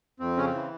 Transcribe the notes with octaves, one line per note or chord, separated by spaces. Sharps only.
F2 C4
C#3 C#4
C4
E3